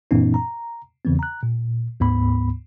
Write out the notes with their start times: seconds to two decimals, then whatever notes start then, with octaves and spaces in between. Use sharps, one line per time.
0.11 F#2 A#2 E3 B3 C#4 D#4
0.34 A#5
1.05 E2 C#3 E3 B3 C4
1.19 A#5 F#6
1.43 A#2
2.00 D2 G#2 B3 B5